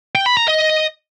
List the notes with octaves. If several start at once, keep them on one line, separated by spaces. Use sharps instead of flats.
G5
B5
A#5
D#5